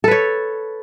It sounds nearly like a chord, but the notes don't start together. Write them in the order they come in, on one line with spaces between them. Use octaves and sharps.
A4 B4 C#5